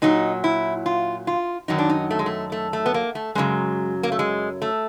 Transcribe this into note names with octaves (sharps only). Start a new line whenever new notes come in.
A#2 F#3 D#4
E4
F4
F4
F#2 D#3 F#3 D#4
D4
D#4
A3
G#3
A3
A3
A3
B3
A#3
A3
F#2 C#3 F#3 G#3
A#3
A3
G#3
A3